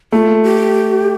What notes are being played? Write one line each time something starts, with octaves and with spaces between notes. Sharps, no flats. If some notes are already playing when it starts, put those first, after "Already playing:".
A3 F4
G4